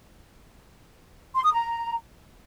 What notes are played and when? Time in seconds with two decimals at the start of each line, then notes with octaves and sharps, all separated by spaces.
1.35 C6
1.44 D#6
1.53 A#5